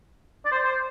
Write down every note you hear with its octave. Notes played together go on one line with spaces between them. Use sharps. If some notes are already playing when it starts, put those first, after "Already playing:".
D5
C5
C5